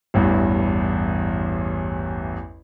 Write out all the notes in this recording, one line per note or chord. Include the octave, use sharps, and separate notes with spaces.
A1 E2 G2